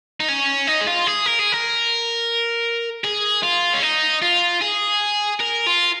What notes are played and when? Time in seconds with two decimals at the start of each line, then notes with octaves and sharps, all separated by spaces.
0.20 D#4
0.28 C#4
0.67 D#4
0.81 G#4
0.87 F4
1.07 G#4
1.26 A#4
1.39 G#4
1.52 A#4
3.04 G#4
3.43 F4
3.74 C#4
3.82 D#4
4.22 F4
4.61 G#4
5.40 A#4
5.66 F4